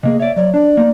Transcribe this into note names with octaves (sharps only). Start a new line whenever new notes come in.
C3 A#3 G#4 D#5
C#5 D5 E5
F#3 C#5 D5
D4 D5
A#3 D#4